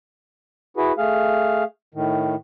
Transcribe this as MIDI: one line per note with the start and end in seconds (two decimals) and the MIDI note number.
0.77 0.92 64
0.77 0.92 66
0.77 0.92 68
0.77 0.92 71
0.98 1.64 57
0.98 1.64 68
0.98 1.64 77
1.94 2.35 45
1.94 2.35 51